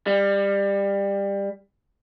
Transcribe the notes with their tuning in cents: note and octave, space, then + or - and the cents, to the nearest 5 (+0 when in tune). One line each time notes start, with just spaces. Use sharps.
G3 +20